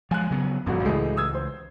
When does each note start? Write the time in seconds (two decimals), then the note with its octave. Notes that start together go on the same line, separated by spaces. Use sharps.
0.11 F3 G#3 G#5 F#6
0.30 C#3 F#3 B3
0.66 D#1 G#1 F#2 A2 F#4
0.85 C#2 A2 E3 G#3 A3
1.16 D#6 E6 G#6
1.35 C5